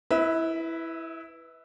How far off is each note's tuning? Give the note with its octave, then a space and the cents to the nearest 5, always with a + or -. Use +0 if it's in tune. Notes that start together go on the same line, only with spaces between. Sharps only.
E4 +0 B4 +0 E5 -40